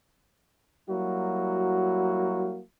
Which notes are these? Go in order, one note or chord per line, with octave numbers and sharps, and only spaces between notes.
F#3 G3 A#3 E4 F#4